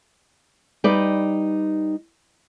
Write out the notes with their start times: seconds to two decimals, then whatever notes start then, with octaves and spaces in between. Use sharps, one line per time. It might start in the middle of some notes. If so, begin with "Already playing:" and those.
0.84 G3 D#4 B4 D5